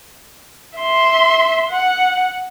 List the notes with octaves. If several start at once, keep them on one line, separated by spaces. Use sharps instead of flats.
E5 C6
F#5